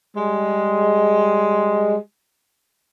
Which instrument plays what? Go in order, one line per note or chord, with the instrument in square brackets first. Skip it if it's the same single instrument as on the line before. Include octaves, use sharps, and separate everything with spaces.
[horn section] G3 G#3